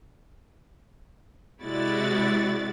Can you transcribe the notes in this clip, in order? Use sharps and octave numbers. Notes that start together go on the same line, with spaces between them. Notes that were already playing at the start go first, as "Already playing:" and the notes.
C3 G#3 E4 F#4 D5 A6